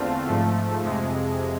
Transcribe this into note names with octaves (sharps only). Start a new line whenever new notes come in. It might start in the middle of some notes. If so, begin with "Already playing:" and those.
Already playing: E2 D3 A3 C4 F4
G#2 F3 A3
F2 C3 G#3